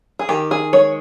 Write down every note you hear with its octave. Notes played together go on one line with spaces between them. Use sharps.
G#4
D#3 G4
G#4
G#3 C#5